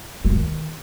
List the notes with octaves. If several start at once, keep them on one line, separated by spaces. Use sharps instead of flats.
G#3
A3
D#3